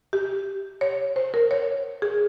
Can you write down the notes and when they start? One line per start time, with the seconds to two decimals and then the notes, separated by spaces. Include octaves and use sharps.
0.13 G4
0.81 C#5
1.16 C5
1.34 A#4
1.51 C#5
2.02 G#4